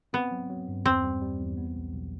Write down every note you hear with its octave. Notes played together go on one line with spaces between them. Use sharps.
B3 C4
F#3
F#3
G2
E2 C4
G3
G3
E2
B3
B1
B1